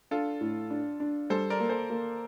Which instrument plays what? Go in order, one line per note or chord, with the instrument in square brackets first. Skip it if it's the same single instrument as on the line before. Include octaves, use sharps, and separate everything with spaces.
[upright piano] D4 [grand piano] F4 A4
[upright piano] A2
D4
D4
[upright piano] G3 [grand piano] A4 C5
[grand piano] A#4 D5
[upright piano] A#3
[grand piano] A4 C5
[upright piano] A#3